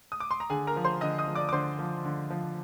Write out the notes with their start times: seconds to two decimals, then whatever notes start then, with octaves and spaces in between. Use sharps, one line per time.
0.12 D#6
0.20 D6
0.31 C6
0.40 A#5
0.50 D3 G#4 G#5
0.67 A#4 A#5
0.76 F3
0.84 C5 C6
1.01 D3 D#5 D#6
1.18 D#5 D#6
1.27 F3
1.35 D5 D6
1.49 D6
1.52 D3 C5 C6
1.79 F3
2.05 D3
2.30 F3